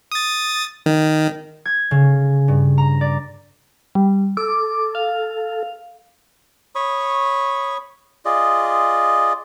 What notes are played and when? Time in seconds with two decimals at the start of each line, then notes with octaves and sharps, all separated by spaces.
0.12 D#6 A6
0.86 D#3
1.65 G#6
1.91 C#3
2.48 G2
2.78 A#5
3.01 D5
3.95 G3
4.37 A4 D6
4.95 F5
6.75 C#5 B5 C#6 D#6
8.25 F4 G#4 D5 D#5